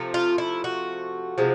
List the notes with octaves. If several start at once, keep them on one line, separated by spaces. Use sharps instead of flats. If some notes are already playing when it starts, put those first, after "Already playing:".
Already playing: C3 F3 A3
F4
E4
F#4
C3 F3 G#3